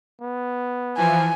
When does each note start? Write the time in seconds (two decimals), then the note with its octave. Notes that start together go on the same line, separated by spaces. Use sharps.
0.21 B3
0.97 E3 F3 G#5